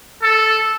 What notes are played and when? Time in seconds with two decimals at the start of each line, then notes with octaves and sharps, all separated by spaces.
0.23 A4